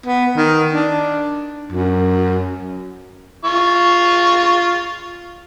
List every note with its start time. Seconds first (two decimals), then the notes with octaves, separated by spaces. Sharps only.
0.06 B3
0.36 D#3
0.73 D4
1.72 F#2
3.45 F4 C#6